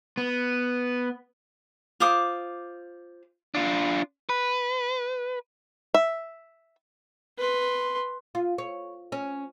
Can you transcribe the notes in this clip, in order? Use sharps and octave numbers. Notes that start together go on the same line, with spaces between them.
B3
F4 C5 D6 D#6
D4 F4
B4
E5
B4 C6
F4
C#5
C#4